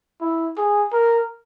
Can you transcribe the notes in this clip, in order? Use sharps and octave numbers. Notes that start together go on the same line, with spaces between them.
E4
G#4
A#4